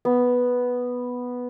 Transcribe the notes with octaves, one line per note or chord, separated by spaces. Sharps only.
B3